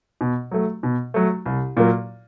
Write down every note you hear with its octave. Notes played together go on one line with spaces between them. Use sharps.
B2
F#3 A3
B2
F#3 A3
C2
A#2 F#3 A#3